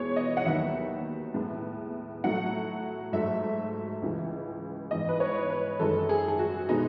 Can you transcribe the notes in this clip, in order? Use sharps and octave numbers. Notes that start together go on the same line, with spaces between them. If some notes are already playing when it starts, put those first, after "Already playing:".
Already playing: E2 B2 G#3 B3 C#5
D#5
F#5
D#2 D#3 F#3 B3 E5
A2 G#3 B3
A2 F#3 A3 F#5
G#2 F#3 A3 E5
C#2 C#3 E3
G#2 E3 B3 D#5
B4
C#5
B4
F#2 D#3 G#3 A4
G#4
G#4
F#4
B2 G#3 B3 D#4